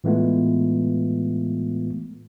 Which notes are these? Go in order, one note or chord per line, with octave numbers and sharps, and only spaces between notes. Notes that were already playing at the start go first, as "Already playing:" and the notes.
A2 E3 G#3 A3 B3 F4